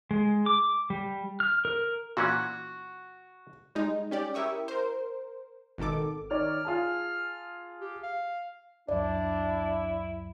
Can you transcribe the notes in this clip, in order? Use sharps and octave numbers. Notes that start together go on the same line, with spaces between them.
G#3
D6
G3
F6
A#4
A#2 E3 C#4 F#4 F#6
G3 G#3 D#4
C#4 G4 D5
E4 G4 A#4 E5 C#6 D#6
A#4 C5
G#1 B2 D#3 A4 D6
D#3 C#5 D5 F6
F4 G#4 A5
G4
F5
C#2 F#2 F#3 D4 E4 D5